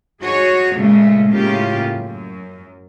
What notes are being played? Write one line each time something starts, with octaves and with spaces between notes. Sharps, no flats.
D#4 F#4 G#4 C#5
A#2 C#3 G#3 A3
A2 C#3 A#3 C#4 F4 G4
F#2